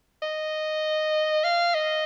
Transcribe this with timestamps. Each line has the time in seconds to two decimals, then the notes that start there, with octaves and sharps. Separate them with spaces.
0.22 D#5
1.44 F5
1.74 D#5